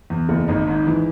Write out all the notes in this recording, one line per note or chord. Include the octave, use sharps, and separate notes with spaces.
E2
F#1
G#1 D#4
G#2
E3